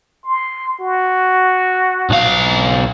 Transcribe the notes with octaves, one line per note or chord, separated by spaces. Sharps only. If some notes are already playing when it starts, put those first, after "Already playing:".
C6
F#4
B1 F5